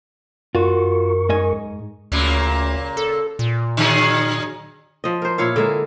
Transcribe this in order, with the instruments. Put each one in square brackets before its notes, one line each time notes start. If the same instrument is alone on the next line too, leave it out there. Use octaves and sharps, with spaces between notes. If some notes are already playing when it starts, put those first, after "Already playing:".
[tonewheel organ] F#2 A#4 C#6 [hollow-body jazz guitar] F4 F#4
[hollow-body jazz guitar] G#2 D#5 G#5
[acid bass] D2 [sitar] A#2 C#3 A#3
[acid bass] A4
A#2
[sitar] D3 F#3 G#4
[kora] F3 D#5
A#4 C5
A#2 E4 C#5 F5
D3 G#3 A#4 E5